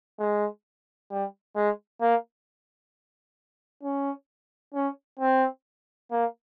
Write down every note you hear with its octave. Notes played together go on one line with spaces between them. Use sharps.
G#3
G3
G#3
A#3
C#4
C#4
C4
A#3